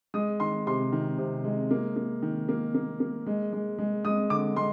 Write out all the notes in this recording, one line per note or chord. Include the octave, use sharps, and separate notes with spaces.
G#3 D#6
D#3 C6
C3 C6
D#3
C3
G#3
A#3
A#3
D#3
A#3
A#3
A#3
G#3
G#3
G#3
G#3 D#6
D3 D6
G#3 C6